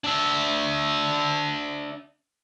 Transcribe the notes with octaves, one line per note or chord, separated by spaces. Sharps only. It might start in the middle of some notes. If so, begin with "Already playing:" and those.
D4 E5